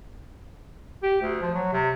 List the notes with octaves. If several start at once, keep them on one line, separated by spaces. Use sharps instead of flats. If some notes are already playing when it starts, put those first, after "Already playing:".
G4
D2
F3
F#3
C3